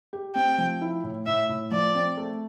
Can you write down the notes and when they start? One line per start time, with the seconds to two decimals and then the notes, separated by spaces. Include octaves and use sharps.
0.13 G4
0.35 C4 G5
0.58 F3
0.81 E4
1.04 A2
1.26 A2 E5
1.49 A2
1.71 F3 D5
1.95 C4
2.17 A3